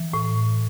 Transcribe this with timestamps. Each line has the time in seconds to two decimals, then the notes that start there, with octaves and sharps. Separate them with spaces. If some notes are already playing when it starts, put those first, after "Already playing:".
Already playing: E3
0.13 A2